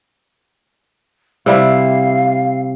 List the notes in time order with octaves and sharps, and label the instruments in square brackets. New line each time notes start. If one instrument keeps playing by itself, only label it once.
[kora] C3 G3 E4 [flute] F5